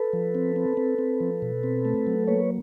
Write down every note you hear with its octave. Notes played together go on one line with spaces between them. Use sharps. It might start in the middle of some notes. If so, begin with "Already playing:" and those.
Already playing: A4 B4
F3
C4
C4
C4
C4
F3
B2
C4
A3
F#3
A#3 B4 C#5